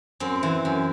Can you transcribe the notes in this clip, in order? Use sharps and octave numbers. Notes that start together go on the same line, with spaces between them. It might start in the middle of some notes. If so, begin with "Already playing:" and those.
F#2 C4
E3
F#2